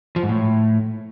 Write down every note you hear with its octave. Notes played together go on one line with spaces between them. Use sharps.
F3
G#2
A2